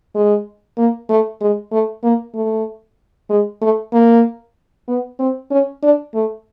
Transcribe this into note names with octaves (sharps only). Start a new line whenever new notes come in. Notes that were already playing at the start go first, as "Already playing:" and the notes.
G#3
A#3
A3
G#3
A3
A#3
A3
G#3
A3
A#3
B3
C4
C#4
D4
A3